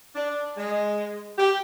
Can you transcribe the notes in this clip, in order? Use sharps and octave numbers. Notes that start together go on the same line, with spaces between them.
D4
G#3
G4